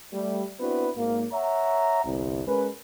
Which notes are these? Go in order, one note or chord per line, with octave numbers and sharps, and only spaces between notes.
G3 A3
B3 C4 D4 E4 F#4 B4
G#1 A#3
C#5 E5 F#5 A#5
G1 C2
G#3 C#4 A#4 B4